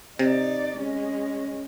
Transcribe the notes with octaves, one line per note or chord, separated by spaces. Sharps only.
C3 D#4 D5
G#3 C#4